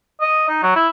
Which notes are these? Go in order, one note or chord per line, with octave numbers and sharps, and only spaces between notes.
D#5
D#4
F#3
E4